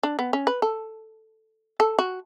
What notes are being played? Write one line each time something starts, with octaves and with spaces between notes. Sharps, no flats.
D4
B3
C#4
B4
A4
A4
F#4